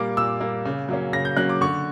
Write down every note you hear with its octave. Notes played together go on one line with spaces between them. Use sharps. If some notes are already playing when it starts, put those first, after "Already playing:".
Already playing: A#2 G3 A#3 D6
A#2 E6
G3 A#3
C#3
F#3 A#3 C#4
C#3 A#6
G6
F#3 A#3 C#4 F#6
D6
D3 C#6